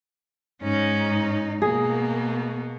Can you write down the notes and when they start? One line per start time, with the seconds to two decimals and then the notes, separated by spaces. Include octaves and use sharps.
0.62 G#2 C#4 D#4
1.62 B2 A#3 G#4